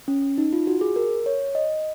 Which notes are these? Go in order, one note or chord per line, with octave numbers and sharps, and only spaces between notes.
C#4
D#4
F4
F#4
G#4
A#4
C#5
D#5